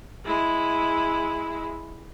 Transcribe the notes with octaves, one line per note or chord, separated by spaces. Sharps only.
G#3 E4